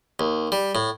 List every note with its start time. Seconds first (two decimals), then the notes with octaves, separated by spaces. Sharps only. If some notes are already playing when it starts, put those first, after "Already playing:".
0.19 D#2
0.52 G3
0.75 A2